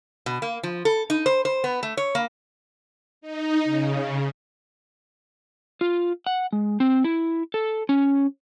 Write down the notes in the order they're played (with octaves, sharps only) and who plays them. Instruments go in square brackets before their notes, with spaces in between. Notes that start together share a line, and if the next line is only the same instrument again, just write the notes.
[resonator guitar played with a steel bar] B2
A#3
F3
A4
D#4
C5
C5
B3
A3
C#5
A#3
[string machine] D#4
C#3
[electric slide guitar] F4
F#5
G#3
C4
E4
A4
C#4